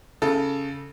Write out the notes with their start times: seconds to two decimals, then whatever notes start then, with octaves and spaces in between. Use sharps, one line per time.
0.22 C#3 A4